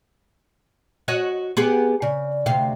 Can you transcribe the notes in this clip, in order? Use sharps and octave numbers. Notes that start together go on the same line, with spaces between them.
F#4 C#5 D#5
B3 G4 G#4
C#3 D5
D2 C3 F5 G5